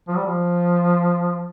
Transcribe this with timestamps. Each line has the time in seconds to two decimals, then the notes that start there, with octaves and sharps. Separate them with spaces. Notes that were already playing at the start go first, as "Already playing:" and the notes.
0.08 F3
0.16 G3
0.26 F3